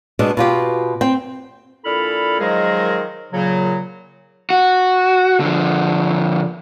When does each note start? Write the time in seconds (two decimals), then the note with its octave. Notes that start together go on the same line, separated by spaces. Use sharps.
0.19 B2 G#3 D4
0.37 B2 F4 G4
1.01 C4 G5
1.85 A#2 D4 E4 A4 B5 F6
2.39 D#3 F3 F#3 G#3 G#4 A#4
3.32 A#2 C#3 F#3
4.50 F#4
5.40 D3 F3